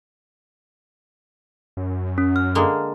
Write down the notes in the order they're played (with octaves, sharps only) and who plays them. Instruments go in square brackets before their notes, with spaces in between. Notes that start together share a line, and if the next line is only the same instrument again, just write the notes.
[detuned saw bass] F#2
[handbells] C#4
F6
[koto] D3 G#3 A#3